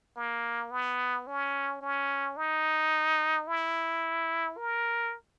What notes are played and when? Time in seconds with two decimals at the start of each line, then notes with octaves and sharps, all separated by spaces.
0.17 A#3
0.71 B3
1.27 C#4
1.81 C#4
2.37 D#4
3.48 E4
4.57 A#4